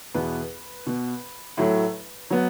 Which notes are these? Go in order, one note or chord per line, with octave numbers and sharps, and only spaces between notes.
E2 B2 B3 B4
B2 B3
A2 F#3 A3
F#3 B3